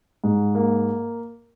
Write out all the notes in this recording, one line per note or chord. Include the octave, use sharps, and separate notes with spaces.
G#2
A#3